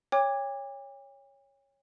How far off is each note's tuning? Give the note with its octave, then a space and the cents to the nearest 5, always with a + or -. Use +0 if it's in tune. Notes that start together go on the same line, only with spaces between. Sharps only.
C#5 +0 G5 +45 D6 +0